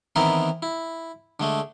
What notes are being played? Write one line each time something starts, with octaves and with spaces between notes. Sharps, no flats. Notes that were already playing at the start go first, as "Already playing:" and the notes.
D#3 E3 B3 C4 E4 A#4
E4
D3 G#3 A3